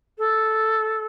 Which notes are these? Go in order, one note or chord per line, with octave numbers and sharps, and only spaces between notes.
A4